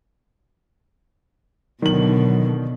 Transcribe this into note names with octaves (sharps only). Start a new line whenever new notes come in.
B2 D3 D#3 F#3 F#7